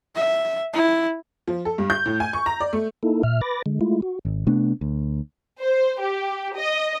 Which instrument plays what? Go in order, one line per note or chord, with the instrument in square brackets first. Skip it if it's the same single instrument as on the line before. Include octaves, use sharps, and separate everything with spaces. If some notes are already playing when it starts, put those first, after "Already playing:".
[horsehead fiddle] E5
E4
[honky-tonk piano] F3
A4
G2
G6
A2
G#5
C#6
A#5
D5
A3
[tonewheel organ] A#3 D#4 E4 A4
A#2 E5 F6
B4 B5 D6 A6 A#6
D3 G#3
G#3 A3 E4 F4
F#4
[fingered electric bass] G#1
C3 A3 B3 D4
D2
[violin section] C5
G4
D#5